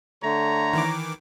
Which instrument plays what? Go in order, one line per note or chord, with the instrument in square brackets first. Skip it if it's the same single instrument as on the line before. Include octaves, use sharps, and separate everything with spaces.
[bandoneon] D3 A3 [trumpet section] C#5 A#5
[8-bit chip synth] D#3 E3 D6